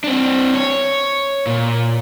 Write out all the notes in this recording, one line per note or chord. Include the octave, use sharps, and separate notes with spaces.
C4 D4
C#5
A#2